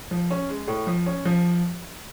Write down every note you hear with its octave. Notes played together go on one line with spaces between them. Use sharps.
F3
C#4
G#3
A2
F3
C#4
F3